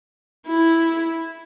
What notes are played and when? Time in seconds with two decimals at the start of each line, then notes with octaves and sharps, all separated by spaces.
0.48 E4